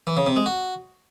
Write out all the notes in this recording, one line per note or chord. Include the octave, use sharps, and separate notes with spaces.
E3
C#3
C3
G#3
F#4